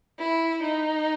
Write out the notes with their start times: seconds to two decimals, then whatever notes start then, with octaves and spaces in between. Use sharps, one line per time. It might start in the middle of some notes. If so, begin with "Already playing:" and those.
0.19 E4
0.63 D#4